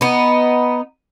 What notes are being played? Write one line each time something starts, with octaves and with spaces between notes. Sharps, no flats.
B3 D#4